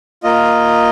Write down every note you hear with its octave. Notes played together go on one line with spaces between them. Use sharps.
A#3 F4 D#5